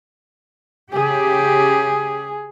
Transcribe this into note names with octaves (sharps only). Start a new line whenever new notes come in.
C#3 G4 G#4